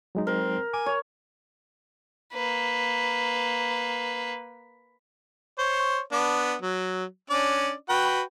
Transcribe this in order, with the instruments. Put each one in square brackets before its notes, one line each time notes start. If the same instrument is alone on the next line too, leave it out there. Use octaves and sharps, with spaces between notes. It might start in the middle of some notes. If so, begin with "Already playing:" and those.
[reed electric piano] F#3 G#3 D#4
[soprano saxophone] C4 [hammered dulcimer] A#4
[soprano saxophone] G#5 [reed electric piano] D6
[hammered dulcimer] C#5
[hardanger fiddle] A#3 B4
[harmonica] C5 C#5
B3 D4
F#3
C#4 D4 D5
F#4 B4 G5